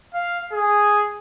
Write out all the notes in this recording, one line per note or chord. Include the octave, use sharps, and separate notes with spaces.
F5
G#4